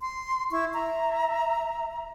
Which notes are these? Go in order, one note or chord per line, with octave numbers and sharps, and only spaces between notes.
C6
E4 C#6
E5 A#5